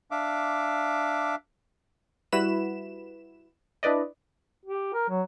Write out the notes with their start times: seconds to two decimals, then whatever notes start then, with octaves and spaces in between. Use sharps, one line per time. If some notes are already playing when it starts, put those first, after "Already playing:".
0.11 D4 E5 F5 D6
2.32 G3 E4 F#4 B4 B5 E7
3.83 D4 E4 B4 D5 D#5
4.65 G4
4.93 A#4
5.09 F#3